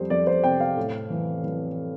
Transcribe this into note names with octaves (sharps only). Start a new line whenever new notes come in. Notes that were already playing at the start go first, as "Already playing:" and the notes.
Already playing: F2 G3 C5
F2 D5
C5
C3 G5
F5
A2
E3
E3